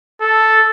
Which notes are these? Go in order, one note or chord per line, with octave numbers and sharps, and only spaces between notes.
A4